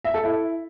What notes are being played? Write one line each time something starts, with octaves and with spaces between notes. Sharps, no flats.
E5
A4
E4